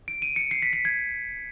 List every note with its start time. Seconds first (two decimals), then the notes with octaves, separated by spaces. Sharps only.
0.08 D7
0.22 D#7
0.36 C#7
0.51 C7
0.62 B6
0.73 B6
0.85 G#6